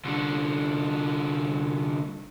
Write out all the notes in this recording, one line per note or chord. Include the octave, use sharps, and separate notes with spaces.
C2 D3